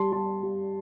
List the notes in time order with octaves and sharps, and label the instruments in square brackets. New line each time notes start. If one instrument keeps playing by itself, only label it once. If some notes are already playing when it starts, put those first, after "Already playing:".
Already playing: [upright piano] G3 A5 C6
G3 A5 C6
G3